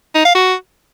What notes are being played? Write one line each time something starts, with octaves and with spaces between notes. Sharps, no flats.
D#4
F5
F#4